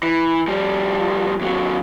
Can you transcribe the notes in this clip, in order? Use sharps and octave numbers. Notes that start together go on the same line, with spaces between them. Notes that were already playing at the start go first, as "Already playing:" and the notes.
E3
F3 G3
D#2 F#3